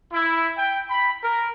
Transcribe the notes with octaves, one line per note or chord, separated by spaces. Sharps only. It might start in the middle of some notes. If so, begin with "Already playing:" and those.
E4
G5
B5
A#4